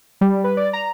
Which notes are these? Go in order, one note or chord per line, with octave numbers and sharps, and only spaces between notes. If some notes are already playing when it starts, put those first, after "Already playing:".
G3
B4
D5
A#5